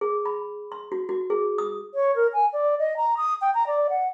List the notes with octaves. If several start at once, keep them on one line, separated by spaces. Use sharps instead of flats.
G#4
B5
C6
F#4
F#4
G#4
D#6
C#5
A#4
G#5
D5
D#5
A#5
D#6
G5
A#5
D5
F#5